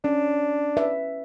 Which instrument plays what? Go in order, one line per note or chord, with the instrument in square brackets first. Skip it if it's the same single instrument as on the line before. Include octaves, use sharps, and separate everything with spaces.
[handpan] C#4 [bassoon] D4
[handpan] B4 E5